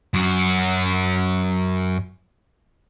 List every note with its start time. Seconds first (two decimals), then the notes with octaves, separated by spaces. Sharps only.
0.14 F#2 F#4